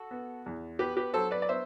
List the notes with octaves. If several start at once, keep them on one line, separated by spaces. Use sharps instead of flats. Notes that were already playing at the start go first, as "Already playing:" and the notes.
Already playing: F#4 A4
B3
E2
B3 G4 B4
G4 B4
F#3 A4 C5
B4 D5
D5
B3 C5 E5